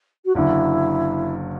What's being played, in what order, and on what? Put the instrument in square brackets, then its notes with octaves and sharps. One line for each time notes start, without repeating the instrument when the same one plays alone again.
[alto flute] F#4
[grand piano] F#1 F#2 D3 [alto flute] E4